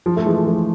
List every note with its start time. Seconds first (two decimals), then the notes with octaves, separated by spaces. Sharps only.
0.06 F3
0.16 A3
0.26 E3 G#3
0.47 F3 A3